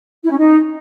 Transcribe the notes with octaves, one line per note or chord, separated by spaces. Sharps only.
E4
C#4
D#4